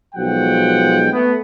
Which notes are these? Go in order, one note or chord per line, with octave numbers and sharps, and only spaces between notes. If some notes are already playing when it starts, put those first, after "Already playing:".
B1 F3 G#3 F#4 F#5 G5
A3 B3